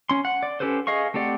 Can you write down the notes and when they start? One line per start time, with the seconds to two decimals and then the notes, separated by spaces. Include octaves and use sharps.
0.09 C#4 C6
0.25 F#5
0.43 D5
0.60 C#4 G4 A4 B4 C5
0.87 G#4 D#5 F5 C#6
1.14 A3 C4 G4 D5 F#5